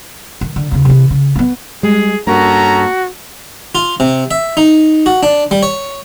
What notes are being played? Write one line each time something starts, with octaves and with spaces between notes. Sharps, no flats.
D#3
D3
D#2 C#3
C3 E3
C#3
A#3 B3
G3 G#3 G#4
G2 A#3 C#4 F#4 A4 A#5
F4
C3
E5
D#4
F#4
D4
G3
C#5